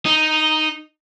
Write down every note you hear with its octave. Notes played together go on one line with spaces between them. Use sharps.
D#4